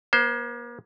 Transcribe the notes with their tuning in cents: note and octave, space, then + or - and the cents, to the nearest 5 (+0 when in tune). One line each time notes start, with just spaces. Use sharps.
A#3 +40 C5 +0